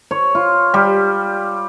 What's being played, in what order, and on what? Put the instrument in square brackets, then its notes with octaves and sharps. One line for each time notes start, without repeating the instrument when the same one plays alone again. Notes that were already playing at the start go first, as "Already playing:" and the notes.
[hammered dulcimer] C#5
F4
G3